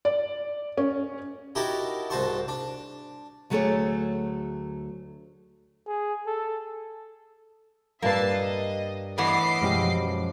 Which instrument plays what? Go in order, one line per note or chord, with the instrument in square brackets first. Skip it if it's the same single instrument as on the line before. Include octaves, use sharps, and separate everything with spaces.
[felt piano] D5
C#4
[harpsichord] D#4 E4 F#4 G4 A#4 A5
C2 G#2 F#4 C5 A5 C#6
D4
[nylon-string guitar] D2 F#3 A3 G#4 A4 C#5
[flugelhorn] G#4
A4
[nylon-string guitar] G2 G3 B4 [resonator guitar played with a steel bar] A#3 [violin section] E5 A5 C7
[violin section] D#5
[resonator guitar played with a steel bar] A2 E3 B3 [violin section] D#5 D6 C7
[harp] F#2 B2 F3 [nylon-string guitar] G#3 G4